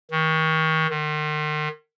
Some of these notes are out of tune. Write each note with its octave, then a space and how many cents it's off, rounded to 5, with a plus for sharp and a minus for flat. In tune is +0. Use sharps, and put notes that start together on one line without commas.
D#3 +35
D#3 -35